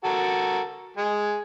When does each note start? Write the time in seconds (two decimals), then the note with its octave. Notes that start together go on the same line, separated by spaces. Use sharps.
0.04 F#4 A4 A#4
0.97 G#3 G#4